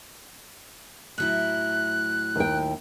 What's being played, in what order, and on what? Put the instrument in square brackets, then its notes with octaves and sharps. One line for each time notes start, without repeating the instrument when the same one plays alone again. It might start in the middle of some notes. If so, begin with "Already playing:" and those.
[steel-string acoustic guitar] A2 F#3 E4 [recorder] F#6
[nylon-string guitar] D#2 G5